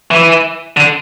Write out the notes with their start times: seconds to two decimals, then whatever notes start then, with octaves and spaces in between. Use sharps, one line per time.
0.11 E3
0.77 D3